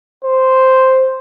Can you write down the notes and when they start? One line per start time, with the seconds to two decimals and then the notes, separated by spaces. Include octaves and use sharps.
0.24 C5